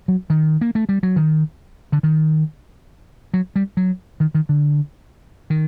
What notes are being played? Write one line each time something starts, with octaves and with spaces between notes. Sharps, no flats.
F#3
D#3
A#3
A3
G3
F#3
D#3
D3
D#3
F#3
G3
F#3
D#3
D#3
D3
D#3